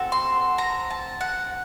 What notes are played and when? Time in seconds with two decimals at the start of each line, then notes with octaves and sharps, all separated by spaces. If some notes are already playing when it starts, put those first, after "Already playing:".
Already playing: C4 F#4 A4
0.12 C6
0.58 A#5
0.90 A5
1.21 F#5